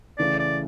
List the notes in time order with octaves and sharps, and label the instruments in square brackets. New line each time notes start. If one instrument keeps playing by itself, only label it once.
[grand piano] C#3 E3 A3 [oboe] D5
[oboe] D5